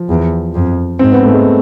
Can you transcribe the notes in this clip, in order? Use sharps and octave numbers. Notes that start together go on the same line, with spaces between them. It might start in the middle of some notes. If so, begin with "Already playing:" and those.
Already playing: F3
E2
F2
G#2 C4
B3
A3
G#3